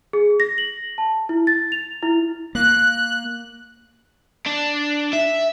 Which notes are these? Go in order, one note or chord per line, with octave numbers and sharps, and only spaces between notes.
G#4
A#6
F#7
A5
E4
A6
F7
E4
A#3 F#6
D4
E5